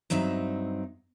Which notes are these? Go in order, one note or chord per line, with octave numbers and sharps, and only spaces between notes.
G2 F#3 C4 D#4 E5